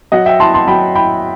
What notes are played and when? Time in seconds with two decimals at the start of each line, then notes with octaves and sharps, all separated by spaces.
0.12 F#3 D#5 F#5
0.26 E5 G5
0.40 E4 A5 C6
0.54 A5 C6
0.67 F#3 G5 B5
0.95 E4 G5 B5